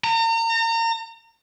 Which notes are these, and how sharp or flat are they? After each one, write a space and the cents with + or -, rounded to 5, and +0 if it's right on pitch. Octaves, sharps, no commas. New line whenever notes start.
A#5 -35